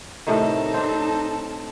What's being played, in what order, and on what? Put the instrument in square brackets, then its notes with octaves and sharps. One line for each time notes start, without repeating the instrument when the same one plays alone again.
[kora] A2 C3 D#3 [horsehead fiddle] D#4 A4
[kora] C4 D4